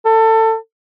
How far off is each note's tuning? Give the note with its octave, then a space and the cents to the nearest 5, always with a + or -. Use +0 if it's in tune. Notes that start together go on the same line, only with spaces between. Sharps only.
A4 +25